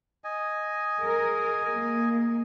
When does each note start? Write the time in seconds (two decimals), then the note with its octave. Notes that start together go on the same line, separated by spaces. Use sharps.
0.24 D#5 G#5
1.00 G#4 A#4
1.73 A#3